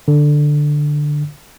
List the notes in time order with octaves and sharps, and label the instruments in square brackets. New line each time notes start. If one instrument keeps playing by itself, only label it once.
[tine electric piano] D3